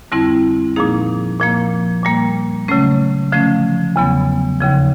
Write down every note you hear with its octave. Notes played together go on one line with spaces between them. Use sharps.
F2 D3 G3 C4 E4
A#2 F3 A#3 D#4 G#4
A#2 F3 A#3
A#2 G3 A#3
C#3 F#3 A3 C#4
D3 F3 A3 C#4
E2 C#3 F#3 B3
D#2 C#3 F3